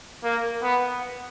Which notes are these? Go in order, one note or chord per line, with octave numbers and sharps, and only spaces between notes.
A#3
B3